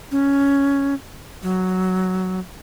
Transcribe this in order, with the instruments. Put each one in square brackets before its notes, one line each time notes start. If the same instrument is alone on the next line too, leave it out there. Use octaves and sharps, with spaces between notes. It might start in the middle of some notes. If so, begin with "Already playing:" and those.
[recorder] C#4
F#3